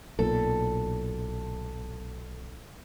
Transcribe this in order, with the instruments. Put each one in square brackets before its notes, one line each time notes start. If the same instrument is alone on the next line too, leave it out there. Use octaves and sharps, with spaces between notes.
[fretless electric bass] B1 A#2 [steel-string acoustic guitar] A4